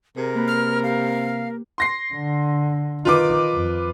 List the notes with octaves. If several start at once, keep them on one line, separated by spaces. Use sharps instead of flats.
C3 G#4 A#4
A#3 B4
F6
G4 F5
C6 A#6 C7
D3
D#3 D#4 F4 B4 D6
F2